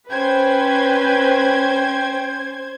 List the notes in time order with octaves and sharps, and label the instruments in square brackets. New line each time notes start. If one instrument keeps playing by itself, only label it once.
[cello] C#4 [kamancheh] B4 [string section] C5 G#6 [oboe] G5